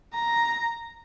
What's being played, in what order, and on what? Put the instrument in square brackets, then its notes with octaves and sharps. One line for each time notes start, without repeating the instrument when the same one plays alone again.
[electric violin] A#5